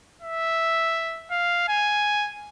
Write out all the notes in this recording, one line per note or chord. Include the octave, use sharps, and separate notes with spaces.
E5
F5
G#5